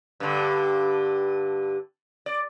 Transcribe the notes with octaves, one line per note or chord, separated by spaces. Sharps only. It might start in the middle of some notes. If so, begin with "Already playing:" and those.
G2 D3
D5